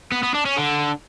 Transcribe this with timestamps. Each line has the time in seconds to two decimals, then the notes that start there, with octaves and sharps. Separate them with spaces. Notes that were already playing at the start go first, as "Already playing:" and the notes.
0.12 B3
0.23 B3
0.34 D4
0.45 C#4
0.57 D3